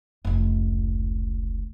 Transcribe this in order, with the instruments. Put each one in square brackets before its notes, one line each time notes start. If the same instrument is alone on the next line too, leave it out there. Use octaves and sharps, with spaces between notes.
[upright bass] F1 C#2